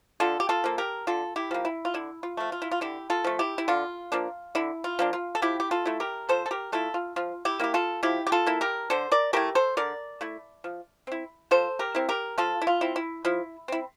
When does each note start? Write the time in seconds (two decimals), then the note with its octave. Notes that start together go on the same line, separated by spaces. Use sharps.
0.20 D3 F4 A4
0.40 G4
0.49 F4 A4
0.64 F3 A#3
0.78 G4 A#4
1.07 D3 F4 A4
1.36 E4 G4
1.51 F3 A#3
1.65 E4
1.85 F4
1.94 D3 E4
2.23 F4
2.37 F3 A3
2.52 F4
2.62 E4
2.71 F4
2.81 D3 E4 G4
3.10 F4 A4
3.24 F3 A3
3.39 E4 G4
3.58 E4
3.68 D3 F4
4.12 F3 A#3 D4
4.55 D3 E4
4.84 F4
4.99 F3 A#3 D4
5.13 F4
5.35 A4
5.42 F3 E4 G4
5.60 G4
5.71 F4 A4
5.86 A3 E4
6.00 G4 A#4
6.29 F3 A4 C5
6.46 A4
6.51 G4 A#4
6.72 A3 E4 F4 A4
6.94 F4
7.16 F3 F4
7.45 E4 G4
7.59 A#3 E4 G4
7.74 F4 A4
8.03 F3 E4 G4
8.27 G4
8.32 F4 A4
8.46 A#3 E4
8.61 G4 A#4
8.90 D3 A4 C5
9.11 A#4 D5
9.33 A3 E4 G4 A#4
9.55 A4 C5
9.77 D3 A#4 D5
10.21 A3 E4
10.64 F3
11.07 C4 E4
11.51 F3 A4 C5
11.79 G4 A#4
11.95 C4 E4
12.09 G4 A#4
12.38 F3 F4 A4
12.62 E4
12.67 F4
12.81 C4 E4
12.96 E4
13.25 F3 E4
13.68 C4 E4